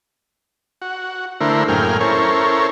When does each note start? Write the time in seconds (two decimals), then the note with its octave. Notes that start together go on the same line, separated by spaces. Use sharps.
0.82 F#4
1.41 D3 A3 E4 A#4 C5
1.68 F#2 A2 A#3 G#4 G5 F6
2.00 C#4 E4 A4 A#4 C5 C#5